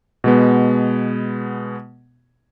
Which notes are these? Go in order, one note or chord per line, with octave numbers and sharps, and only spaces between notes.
B2 G#3 B3